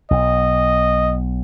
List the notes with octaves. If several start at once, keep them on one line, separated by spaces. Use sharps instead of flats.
B1 D#5